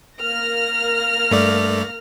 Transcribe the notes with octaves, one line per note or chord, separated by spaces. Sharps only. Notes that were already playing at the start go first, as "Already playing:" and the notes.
A#3 F6 A#6
G2 A3 D5